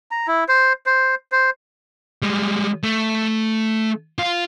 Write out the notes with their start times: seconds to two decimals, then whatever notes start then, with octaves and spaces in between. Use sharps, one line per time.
0.11 A#5
0.27 E4
0.49 C5
0.86 C5
1.32 C5
2.22 G3 G#3
2.83 A3
4.19 F4